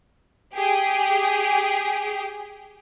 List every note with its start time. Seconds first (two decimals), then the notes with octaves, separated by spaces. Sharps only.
0.55 G4 G#4